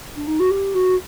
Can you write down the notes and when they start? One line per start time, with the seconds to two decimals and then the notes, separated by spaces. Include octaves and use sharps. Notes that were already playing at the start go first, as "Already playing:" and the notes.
0.16 D4
0.27 D#4
0.39 F#4
0.50 G4
0.74 F#4